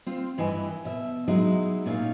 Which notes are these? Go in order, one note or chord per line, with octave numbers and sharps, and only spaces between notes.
C4 F4
G2 E3 E4 B4 D#5 G#5
B2 E5
F#3 G#3 D#4 E4
A#2 C#4 D#4 F4 F5